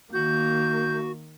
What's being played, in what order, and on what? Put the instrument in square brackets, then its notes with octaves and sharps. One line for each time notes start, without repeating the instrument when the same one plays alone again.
[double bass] D#3 [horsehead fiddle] A#3 [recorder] F#4 [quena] G6